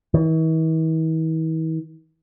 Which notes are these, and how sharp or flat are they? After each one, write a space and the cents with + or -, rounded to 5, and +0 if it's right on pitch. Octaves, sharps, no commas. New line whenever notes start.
E3 -45